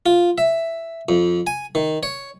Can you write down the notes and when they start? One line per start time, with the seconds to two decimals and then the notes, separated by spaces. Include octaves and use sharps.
0.06 F4
0.38 E5
1.09 F2
1.47 G#5
1.75 D#3
2.03 C#5